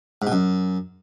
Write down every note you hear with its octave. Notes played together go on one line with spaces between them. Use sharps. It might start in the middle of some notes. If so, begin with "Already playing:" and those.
G#2
B2
F#2